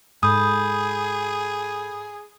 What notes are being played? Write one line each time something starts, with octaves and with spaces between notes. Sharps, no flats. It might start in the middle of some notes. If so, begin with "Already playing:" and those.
G#2 G#4 A4 B5 D#6 G6